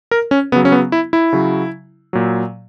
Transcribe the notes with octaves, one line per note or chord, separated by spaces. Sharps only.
A#4
C#4
C#3 F#3 B3
C#4
B3
E4
E4
C#3 F#3
A#2 F#3